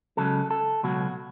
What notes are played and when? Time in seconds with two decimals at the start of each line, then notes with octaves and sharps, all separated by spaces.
0.17 C#2 C#3 F#3 A4
0.51 A4
0.83 C#2 B2 F#3 F#4